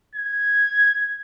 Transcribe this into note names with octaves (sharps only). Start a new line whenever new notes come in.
G#6